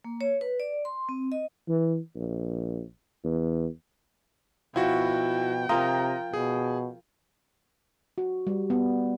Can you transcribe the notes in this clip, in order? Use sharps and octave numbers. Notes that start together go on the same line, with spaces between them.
A#3
C#5
B4
D5
C6
C4
D#5
E3
A#1
E2
B2 F3 E4 F#4 G5
C3 F4 A#4 A#5 D#6
B2 G#4
F#4
G3
B3